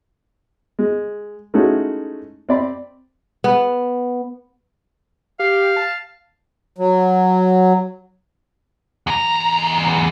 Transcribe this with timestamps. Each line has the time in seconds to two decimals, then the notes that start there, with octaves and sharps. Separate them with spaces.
0.79 G#3
1.54 G#3 A3 C#4 D#4 E4 F#4
2.49 C4 D5 B5
3.44 B3
5.39 G4 F5
5.76 A5
6.78 F#3
9.07 E2 A#5